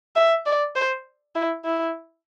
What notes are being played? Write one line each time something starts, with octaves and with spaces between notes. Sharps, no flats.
E5
D5
C5
E4
E4